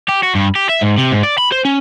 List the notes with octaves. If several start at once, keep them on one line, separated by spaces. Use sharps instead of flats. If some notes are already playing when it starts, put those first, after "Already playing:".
G4
F#4
G2
G4
E5
G#2
C3
G#2
D5
B5
C5
C#4